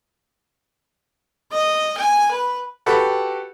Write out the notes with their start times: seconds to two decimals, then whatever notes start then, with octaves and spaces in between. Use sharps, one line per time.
1.52 D#5
1.98 G#5
2.31 B4
2.86 F#4 G4 A4 B4 G5 B5